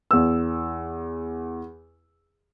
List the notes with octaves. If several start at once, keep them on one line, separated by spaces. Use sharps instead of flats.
E2 E6